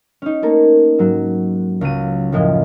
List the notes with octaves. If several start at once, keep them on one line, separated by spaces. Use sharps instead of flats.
C#4 D#4
A3 A#3 A4 A#4
G#2 F#3
C#2 F#3 D#7
F#1 A2 F3 E4 D#5